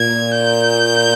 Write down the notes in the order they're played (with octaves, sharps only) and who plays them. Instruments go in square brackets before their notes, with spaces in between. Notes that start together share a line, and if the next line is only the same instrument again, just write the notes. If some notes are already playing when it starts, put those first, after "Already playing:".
Already playing: [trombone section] A#2 [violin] G#6
[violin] G6